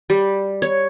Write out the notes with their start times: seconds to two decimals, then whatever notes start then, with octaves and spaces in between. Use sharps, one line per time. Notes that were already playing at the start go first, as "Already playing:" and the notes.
0.10 G3
0.62 C#5